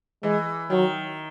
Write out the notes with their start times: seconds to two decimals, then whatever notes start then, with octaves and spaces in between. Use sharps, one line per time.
0.23 E3 G#3
0.70 D#3 F#3